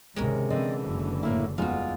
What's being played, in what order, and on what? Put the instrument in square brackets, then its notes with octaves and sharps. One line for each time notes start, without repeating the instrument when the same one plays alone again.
[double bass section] G#1 C#2 [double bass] C3 [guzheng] G#3 C#4 A#4
[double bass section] D3 E3 [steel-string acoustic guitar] C4 D5 D#5
[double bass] F#1 [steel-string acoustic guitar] D2
[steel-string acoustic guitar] A2 A#3 E4
[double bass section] E2 [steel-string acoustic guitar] G3 G#3 F4 [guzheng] D#4 F#4